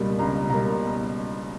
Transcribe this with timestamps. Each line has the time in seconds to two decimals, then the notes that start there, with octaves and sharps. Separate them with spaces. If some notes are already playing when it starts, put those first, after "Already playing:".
Already playing: C#2 B2 G3 A#3
0.19 C#2 A#5
0.49 B2 G3 A#3 A#5